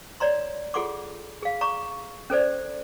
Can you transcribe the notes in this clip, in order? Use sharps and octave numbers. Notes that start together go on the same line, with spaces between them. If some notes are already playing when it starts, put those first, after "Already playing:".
C#5 D5 A#5 C6
F4 G#4 A4 F#5 C6 D6
G#4 F5
A#5 C#6 D6
C#4 A4 C5 D5